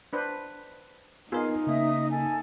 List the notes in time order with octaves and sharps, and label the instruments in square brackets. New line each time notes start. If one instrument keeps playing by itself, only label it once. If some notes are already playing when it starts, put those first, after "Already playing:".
[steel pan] D4 B4 C5
[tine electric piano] B3 A#4 D#5 [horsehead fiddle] D#4 [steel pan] F4 G#4
[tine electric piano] C#3 A#3 [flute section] D#5 E5 D#6
[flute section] A4 G#5